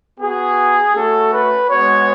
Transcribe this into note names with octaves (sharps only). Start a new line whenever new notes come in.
B3 F#4 G#4
A3 C#4 F#4 A4
B4
G#3 B3 F#4 C#5